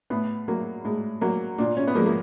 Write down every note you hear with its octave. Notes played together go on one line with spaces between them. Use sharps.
A2 B3
F#3 A#3
A2 G#3
F#3 A#3
A#2 D4
C#4
B3
F3 G#3 A#3
A#3